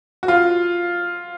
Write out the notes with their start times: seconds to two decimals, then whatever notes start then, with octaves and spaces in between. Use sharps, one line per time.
0.23 F#4
0.28 F4